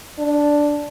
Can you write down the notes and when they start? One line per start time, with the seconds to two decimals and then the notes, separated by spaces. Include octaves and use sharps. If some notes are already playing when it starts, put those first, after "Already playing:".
0.19 D4